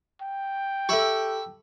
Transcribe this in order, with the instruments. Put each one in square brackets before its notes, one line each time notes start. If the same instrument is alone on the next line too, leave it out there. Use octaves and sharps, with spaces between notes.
[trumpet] G5
[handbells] G4 A4 [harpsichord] E5 B5 C#6